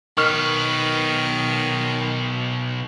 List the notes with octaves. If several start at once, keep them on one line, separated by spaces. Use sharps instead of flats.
B1 D#3 B4 C#6 F6